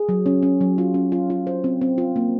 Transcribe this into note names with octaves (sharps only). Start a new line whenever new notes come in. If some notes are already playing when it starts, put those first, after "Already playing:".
Already playing: G#4
F#3
C#4
C#4
F#3
F4
C#4
F4
F4
C5
C4
C4
F4
A#3